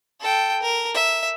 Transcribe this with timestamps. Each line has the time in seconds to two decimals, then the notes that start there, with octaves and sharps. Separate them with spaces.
0.20 A4 G5
0.62 A#4
0.94 E5